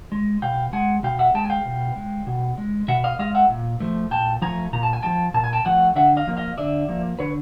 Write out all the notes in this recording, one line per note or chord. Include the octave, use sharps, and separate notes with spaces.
G#3
B2 F5 G5
G#3 F#5 G#5
B2 F5 G5
E5 F#5
G#3 G5 A5
G#5
F5 G5
B2
G#3
B2
G#3
B2 E5 F#5
D#5 F5
G#3 D#5 F5
E5 F#5
A#2
F3 A3
A#2 G5 A5
F3 A3 G#5 A#5
A#2 A#5
A5
G#5
F3 A3 G5 A5
A#2 A5
G#5
G5 A5
F3 A3 F#5 G#5
D3 E5 F#5
D#5 F5
F3 A#3
D#5 F5
D3 D5 E5
F3 A#3
D3 B4 C#5